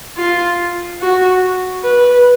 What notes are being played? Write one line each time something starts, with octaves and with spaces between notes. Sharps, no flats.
F4
F#4
B4